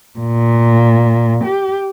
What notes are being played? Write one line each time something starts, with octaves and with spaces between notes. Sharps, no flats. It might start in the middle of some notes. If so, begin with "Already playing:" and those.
A#2
G4